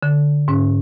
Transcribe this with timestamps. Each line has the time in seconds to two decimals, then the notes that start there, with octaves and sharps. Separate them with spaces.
0.03 D3
0.48 G#2 C#4